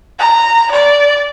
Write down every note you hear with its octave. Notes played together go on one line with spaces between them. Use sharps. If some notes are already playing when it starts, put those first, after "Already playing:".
A#5
D5